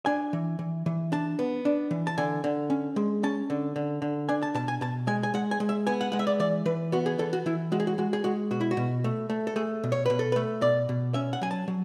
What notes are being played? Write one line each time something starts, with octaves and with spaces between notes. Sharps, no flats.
D4 G#5
E3
E3
E3
D4 A5
B3
D4
E3
A5
D3 G#5
D3
C#4
G#3
C#4 A5
D3
D3
D3
D4 G#5
A5
B2 A5
G#5
B2 A5
G#3 G#5
G#5
G#3 F#5
G#5
G#3
E5
B3 G#5
F#5
G#3 F#5
E5
D5
E3 D5
E3 B4
B3 F#4
G#4
E3 A4
F#4
E3 E4
G#3 F#4
G#4
F#4
G#3 F#4
G#4
G#3 F#4
B2 F#4
E4
F#4
B2
A3
A3
A4
A3 G#4
B2
C#5
B2 B4
A4
B4
A3
B2 D5
B2
C#4 E5
F#5
F#3 G#5
A5
F#3